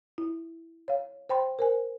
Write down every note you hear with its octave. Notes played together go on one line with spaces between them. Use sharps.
E4
C#5 F5
C5 G5 B5 C6
A#4 C5 G#5